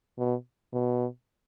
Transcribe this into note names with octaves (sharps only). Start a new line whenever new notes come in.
B2
B2